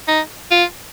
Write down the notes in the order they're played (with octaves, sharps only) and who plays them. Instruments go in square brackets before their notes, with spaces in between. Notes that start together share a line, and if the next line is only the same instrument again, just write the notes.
[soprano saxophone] D#4
F4